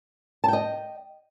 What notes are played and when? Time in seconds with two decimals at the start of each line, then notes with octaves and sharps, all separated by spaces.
0.44 A5
0.48 G5
0.53 D#5